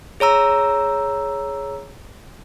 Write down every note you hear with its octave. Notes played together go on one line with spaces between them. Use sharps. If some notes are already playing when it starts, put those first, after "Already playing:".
G#4 C#5 A#5 E6